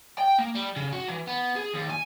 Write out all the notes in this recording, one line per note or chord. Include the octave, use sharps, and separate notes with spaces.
G5
A#3
G3
C#3
F#4
E3
B3
G#4
D#2
G#5